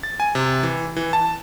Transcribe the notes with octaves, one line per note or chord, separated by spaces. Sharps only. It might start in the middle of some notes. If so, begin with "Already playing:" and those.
A6
G#5
C3
E3
E3
A5